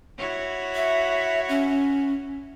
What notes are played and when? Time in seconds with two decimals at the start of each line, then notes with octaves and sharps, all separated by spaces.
0.18 E4 F#4 C#5
0.75 E5
1.49 C#4